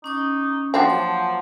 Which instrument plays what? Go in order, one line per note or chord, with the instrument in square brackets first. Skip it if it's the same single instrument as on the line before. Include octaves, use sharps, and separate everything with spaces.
[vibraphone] C#4 D6 D#6 [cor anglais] D#4
[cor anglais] F3 [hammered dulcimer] A#3 F#5 A5 [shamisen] C4 D4 F#4 [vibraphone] C5
[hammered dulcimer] F#3 [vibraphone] D6